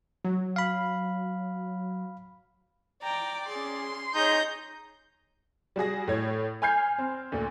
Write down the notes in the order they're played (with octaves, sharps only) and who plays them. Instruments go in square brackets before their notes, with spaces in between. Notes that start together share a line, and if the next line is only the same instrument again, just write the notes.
[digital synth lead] F#3
[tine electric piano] F5 B5
[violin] D5 [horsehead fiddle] G5 [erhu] A#5
[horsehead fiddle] C#4 G#4 [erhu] C6
[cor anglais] D#4 [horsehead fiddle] G#4 C#5 [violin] G6 A#6
[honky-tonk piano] G3 F#4 G#4 A#6
A2 C#5 G#6
G#5 B5 F6 G6 G#6 C7
C4
D2 A#2 A3